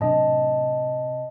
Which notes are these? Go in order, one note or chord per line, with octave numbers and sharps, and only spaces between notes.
A2 C3 F#3 D4 D#5 A5